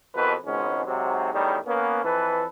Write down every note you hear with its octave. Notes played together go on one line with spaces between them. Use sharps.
F2 B2 E3 A#4 B4
G#1 C#2 G#2 G#3 B3 C#4
G#2 C3 F#3
E2 A2 D#3 G3 A3 D#4
A#3 B3 C#4
F2 E3 A4 B4